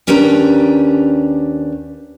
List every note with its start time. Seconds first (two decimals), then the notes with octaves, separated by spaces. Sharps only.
0.07 D#2 C#4 D4 G4 B4 A#5